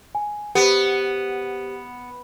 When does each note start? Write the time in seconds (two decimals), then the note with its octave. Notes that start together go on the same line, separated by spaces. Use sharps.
0.15 G#5
0.55 B3 G4 C5